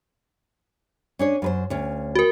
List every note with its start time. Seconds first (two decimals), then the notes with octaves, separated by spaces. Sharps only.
1.19 C#4 D4 C#5
1.42 F#2 B4 C5
1.70 D2 C#4
2.15 F#4 A#4